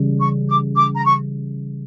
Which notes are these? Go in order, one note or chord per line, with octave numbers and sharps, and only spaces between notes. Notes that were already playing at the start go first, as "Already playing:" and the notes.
Already playing: C#3 E3 G3
C#6
D6
D6
A#5
C#6